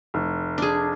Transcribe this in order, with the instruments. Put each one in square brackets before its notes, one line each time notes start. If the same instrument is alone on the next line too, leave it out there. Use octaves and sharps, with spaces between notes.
[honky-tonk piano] F1
[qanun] D4 G#4